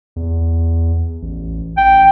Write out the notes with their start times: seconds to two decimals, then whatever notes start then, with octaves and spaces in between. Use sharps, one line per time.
0.16 E2
1.22 A1
1.78 A1 G5